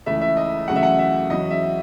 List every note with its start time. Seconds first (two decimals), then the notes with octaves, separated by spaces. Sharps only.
0.06 C#2 C#3 E3 A3 E4 E5
0.21 E5
0.37 D#5
0.68 E2 C#3 F#3 A3 C#4 F#5
0.76 E5
0.83 F#5
0.99 E5
1.30 E2 C#3 F#3 C#4 D#5
1.50 E5